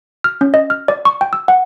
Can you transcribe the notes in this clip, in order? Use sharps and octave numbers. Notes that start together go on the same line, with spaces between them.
F6
C#4
D#5
F6
D5
C#6
G5
E6
F#5